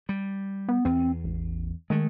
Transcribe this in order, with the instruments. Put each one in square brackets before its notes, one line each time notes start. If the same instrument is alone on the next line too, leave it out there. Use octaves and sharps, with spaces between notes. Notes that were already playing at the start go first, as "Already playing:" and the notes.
[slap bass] G3
[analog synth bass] B3
[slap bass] E2 [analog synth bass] C4
[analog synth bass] A1
[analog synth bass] D#3 [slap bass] G#3 A3